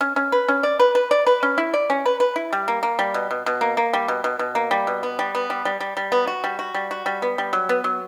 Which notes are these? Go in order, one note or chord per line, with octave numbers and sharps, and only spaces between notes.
C#4
C#4
B4
C#4
D5
B4
B4
D5
B4
C#4
E4
D5
C#4
B4
B4
E4
G3
A#3
A#3
G3
B2
B2
B2
A#3
A#3
G3
B2
B2
B2
A#3
G3
B2
B3
G3
B3
G3
G3
G3
G3
B3
F#4
G3
F#4
G3
F#4
G3
B3
G3
F#3
B3
F#3